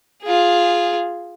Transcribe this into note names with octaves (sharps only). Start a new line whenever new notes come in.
F4 G#4